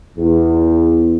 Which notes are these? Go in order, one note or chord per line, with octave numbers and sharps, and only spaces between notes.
E2